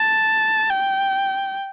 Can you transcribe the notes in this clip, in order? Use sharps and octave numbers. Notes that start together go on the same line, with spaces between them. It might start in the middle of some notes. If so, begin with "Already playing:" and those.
Already playing: A5
G5